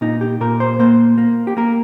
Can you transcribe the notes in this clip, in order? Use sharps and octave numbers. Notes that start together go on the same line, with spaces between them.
A#2 D#4
G4
A#2 A#4
C5
A#3 C5
A#3
G4
A#3 A#4